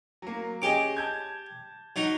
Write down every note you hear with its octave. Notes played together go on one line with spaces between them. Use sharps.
F#3 A#3
C#4 G4 G#4 D#5 D6
A5 G6 G#6
F#3 D#4